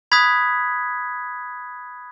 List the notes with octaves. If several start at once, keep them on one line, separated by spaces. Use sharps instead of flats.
B5 D#6 F#6 G#6 B6